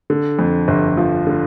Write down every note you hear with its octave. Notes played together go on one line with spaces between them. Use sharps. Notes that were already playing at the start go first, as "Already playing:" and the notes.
D3
F2
G1
F3
D3